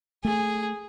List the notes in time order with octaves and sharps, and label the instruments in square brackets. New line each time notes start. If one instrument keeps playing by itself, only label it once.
[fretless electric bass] A3 [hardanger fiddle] G#4